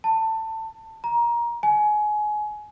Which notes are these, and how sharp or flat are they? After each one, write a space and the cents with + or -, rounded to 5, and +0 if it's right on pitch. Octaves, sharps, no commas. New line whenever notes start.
A5 +20
A#5 +20
G#5 +25